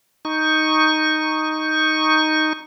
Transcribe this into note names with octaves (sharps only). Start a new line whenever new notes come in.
D#4 C#6